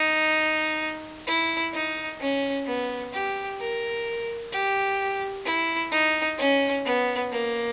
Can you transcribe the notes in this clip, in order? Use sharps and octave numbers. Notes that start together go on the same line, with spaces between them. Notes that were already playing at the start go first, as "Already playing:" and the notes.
Already playing: D#4
E4
D#4
C#4
B3
G4
A#4
G4
E4
D#4
C#4
B3
A#3